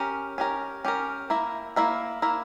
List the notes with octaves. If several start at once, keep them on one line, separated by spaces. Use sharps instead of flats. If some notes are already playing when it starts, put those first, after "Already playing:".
Already playing: C#4 G4 A#4
C#4 G4 A#4
C#4 G4 A#4
A#3 E4 A#4 E5
A#3 E4 A#4 E5
A#3 E4 A#4 E5